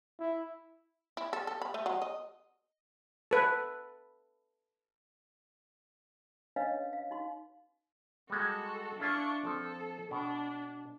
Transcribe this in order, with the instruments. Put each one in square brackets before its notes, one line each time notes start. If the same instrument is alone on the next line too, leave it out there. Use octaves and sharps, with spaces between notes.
[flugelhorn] E4
[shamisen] E4
A4
A4
B5
A3
F#3
D#5
[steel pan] A4 B4
[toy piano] C#4 D4 B4 C#5 D#5 F5
F5
D#4 F#4 C6
[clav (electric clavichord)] G3 G#3 [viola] F#4 A4
[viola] D4 C#6 [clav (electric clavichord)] E4 F4 A4
[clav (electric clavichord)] F3 C4 [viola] A4
[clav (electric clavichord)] B2 [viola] D4